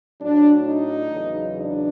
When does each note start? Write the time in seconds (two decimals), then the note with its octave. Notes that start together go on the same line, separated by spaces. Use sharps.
0.20 A2 F#3 D4
0.65 D#4
1.11 E2 C#3 F#3
1.56 D4